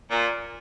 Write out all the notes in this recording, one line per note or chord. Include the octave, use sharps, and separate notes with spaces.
A#2